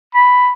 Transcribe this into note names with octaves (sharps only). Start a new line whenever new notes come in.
B5